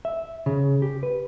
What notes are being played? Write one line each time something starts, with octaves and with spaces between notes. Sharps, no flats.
E5
C#3
G4
B4